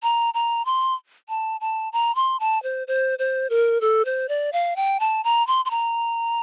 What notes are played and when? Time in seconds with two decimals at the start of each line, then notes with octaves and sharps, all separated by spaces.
0.03 A#5
0.34 A#5
0.66 C6
1.29 A5
1.61 A5
1.93 A#5
2.15 C6
2.40 A5
2.63 C5
2.88 C5
3.19 C5
3.50 A#4
3.81 A4
4.05 C5
4.29 D5
4.53 F5
4.76 G5
5.00 A5
5.24 A#5
5.47 C6
5.65 C6
5.71 A#5